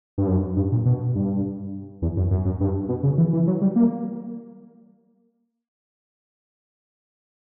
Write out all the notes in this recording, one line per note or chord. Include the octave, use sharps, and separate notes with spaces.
G2
F#2
G2
A#2
B2
G2
E2
F#2
F#2
F#2
G2
B2
C#3
E3
E3
F#3
G3
A#3